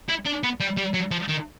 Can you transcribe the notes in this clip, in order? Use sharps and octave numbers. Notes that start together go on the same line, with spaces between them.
E4
D4
B3
G3
G3
F#3
F3
D#3